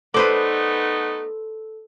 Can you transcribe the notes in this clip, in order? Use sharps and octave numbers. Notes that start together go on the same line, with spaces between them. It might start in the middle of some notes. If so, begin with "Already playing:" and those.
A3 B3 D#4 A4 B4 C5 D5